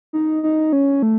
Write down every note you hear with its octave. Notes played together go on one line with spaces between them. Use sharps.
D#4
D#4
C#4
A3